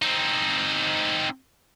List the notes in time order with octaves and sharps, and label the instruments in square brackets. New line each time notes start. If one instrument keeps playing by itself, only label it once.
[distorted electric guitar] C4 D#4